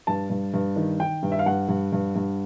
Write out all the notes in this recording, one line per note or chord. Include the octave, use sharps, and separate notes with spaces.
G2 A5
G2
G2
D#3
D#3 G5
G2
E5
F5
G2 F#5
G2
G2
G2